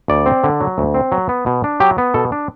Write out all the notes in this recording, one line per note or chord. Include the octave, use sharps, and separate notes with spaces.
D2 D5
C4
D3
F#3
D2
C4
F#3
B3
B2
D4
F#3 G4
B3
B2 A4
D4